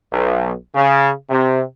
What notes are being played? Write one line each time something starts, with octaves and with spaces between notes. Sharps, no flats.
B1
C#3
C3